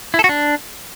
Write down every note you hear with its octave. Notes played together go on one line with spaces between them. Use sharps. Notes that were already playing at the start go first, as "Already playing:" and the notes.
E4
A4
F#4
D4